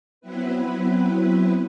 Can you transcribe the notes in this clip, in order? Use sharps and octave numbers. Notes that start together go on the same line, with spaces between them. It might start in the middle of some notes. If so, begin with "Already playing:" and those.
F#3 B3 C4 E4 B4